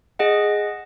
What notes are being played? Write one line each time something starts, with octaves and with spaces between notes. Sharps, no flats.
G#4 D#5 F#5